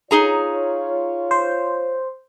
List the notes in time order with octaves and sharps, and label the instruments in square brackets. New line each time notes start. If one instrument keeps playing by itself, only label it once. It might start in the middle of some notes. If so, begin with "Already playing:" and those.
[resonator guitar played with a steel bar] D#4 G#4 A#5 [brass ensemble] F4 C#5
[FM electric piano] C5